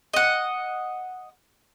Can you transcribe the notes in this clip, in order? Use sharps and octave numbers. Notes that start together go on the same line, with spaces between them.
D#5 F#5